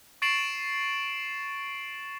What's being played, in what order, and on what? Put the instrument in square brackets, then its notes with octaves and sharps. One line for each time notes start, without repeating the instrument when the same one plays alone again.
[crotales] C#6 A6 C7 D7 E7 F#7